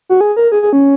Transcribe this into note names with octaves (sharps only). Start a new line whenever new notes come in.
F#4
G#4
A#4
G#4
G#4
C#4